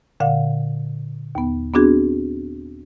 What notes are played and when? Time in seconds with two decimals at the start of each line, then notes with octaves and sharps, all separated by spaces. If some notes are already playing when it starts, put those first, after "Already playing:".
0.20 A#2 D3 F5 F#5
1.35 D#2 B3
1.74 B3 C4 D4 F#4 G#4